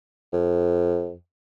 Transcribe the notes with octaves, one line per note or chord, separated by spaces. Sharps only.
F2